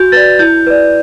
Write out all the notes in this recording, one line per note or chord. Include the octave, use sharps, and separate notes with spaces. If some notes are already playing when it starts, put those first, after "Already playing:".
Already playing: F#4 G6
B4 D5 A6
E4 G6
B4 D5